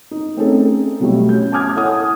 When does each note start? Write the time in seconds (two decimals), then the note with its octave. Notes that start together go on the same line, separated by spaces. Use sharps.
0.11 D#4
0.37 A3 C4 C#4 D#4 G#4 A4
1.00 B2 F#3 G3 A3
1.29 C#4 G6
1.52 G#5 A5 D6 D#6 F6 G#6
1.75 E4 A4 C#5 F#5 D#6